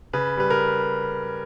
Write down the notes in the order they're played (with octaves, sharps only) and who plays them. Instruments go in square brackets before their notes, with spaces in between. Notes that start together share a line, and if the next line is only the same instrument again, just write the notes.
[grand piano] C#3 B4
G3 B4
A#4